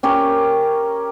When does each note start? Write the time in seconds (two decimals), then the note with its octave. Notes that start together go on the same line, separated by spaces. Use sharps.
0.03 C#4 G4 A#4 C#5